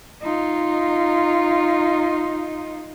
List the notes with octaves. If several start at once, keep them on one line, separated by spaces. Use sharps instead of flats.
D#4 F4